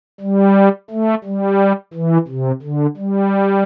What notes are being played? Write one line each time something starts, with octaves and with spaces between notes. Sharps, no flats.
G3
A3
G3
E3
C3
D3
G3